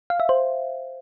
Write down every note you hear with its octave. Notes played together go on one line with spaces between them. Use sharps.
F5
E5
C5